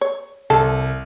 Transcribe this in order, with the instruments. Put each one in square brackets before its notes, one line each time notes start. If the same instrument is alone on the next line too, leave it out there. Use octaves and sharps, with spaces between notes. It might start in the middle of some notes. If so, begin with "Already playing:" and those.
[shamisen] C#5
[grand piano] C2 [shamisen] A4